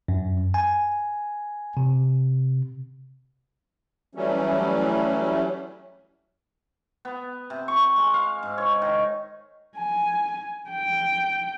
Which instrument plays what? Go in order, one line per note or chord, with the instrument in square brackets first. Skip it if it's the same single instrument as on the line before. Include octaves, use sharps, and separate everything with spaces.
[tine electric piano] F#2
G#5
C3
[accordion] E3 F#3 G3 A3 C#4
[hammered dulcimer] B3
C3
C#6
G#3
F5
G#2
C#5
D#3
[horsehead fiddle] G#5
G5